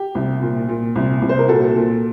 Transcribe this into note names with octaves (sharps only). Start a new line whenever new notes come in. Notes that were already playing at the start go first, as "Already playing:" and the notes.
Already playing: G4
C2
A#2
A#2
C2
C2
C5
A#4
A#2 F#4 A4
A#2